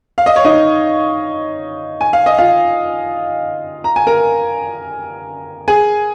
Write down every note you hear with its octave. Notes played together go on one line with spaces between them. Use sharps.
F5
D#5
C#5
D#4 D#5
G#5
F5
D#5
F4 F5
A#5
G#5
A#4 A#5
G#4 G#5